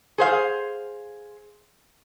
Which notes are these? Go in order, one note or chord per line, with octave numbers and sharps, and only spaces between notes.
G#4 C5 F5